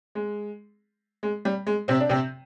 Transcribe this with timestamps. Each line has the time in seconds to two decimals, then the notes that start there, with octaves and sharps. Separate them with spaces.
0.15 G#3
1.23 G#3
1.45 G3
1.67 G#3
1.88 C3 C4
2.00 D4
2.09 C3 C4